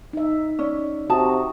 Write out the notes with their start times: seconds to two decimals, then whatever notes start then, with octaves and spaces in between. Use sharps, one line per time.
0.13 D#4 E5
0.59 C#4 D5
1.10 C3 F#4 A5 A#5 D#6